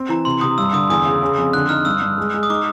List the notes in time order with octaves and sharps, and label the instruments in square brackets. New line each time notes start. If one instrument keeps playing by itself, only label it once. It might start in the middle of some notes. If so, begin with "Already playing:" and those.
Already playing: [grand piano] C4
[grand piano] E3 [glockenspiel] A#5
[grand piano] C3 [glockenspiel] C6
[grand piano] C3 [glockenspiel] D#6
[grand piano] G2 [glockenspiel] E6
[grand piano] D3 [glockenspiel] D#6
[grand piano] E2 [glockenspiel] D#6
[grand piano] C#3
C#3
F2
[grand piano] D3 [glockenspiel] F#6
[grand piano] D#4 [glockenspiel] F6
[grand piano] G2 [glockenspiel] E6
[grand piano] G2
G#3
G#3
[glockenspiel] D#6
[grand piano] D#4 [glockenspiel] D6